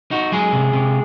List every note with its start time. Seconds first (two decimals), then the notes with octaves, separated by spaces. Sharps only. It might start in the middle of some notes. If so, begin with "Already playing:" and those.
0.11 D#4 F#4
0.32 F#3 G#3 G#4
0.53 C3
0.73 C3